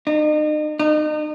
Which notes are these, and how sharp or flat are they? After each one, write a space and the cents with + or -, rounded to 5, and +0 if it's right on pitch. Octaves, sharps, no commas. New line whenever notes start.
D#4 -40
D#4 -35